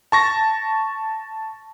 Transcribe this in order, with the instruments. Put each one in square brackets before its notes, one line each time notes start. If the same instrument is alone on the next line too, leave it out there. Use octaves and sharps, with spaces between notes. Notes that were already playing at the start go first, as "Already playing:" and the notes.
[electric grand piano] A5 C#6 A#6